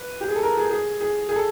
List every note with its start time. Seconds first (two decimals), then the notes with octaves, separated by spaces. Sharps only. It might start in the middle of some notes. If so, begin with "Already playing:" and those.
Already playing: B4
0.21 G4
0.28 G#4
0.36 A4
0.43 A#4
0.57 G#4
0.71 G#4
1.01 G#4
1.29 G#4
1.36 A4